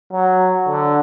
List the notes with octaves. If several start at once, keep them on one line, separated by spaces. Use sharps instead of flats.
F#3
D3